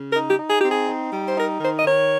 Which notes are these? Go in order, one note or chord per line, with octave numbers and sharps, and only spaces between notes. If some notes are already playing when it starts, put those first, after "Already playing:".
Already playing: C#3
A#4
D#4
G4
D#4
G#4
G4
C4 G#4
D#4
G3
C5
D#4 A#4
D#3 C5
D#5
D#3 C#5